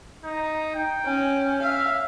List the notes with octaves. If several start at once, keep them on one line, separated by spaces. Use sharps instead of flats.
D#4
G5
C#4
E5 F5